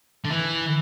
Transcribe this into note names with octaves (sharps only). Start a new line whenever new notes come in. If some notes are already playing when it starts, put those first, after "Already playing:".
D3
E3